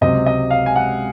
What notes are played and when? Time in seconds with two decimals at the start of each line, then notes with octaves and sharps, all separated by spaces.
0.01 C#2 C3 F#3 C4 D#5
0.26 D#5
0.50 F5
0.66 G#5
0.76 F#5